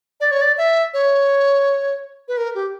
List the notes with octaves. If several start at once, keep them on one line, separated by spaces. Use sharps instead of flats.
D5
C#5
D5
E5
C#5
B4
A#4
G4